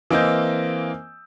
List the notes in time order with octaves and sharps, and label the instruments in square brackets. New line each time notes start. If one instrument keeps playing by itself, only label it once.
[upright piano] E3 A#3 C4 D#5 E6 G6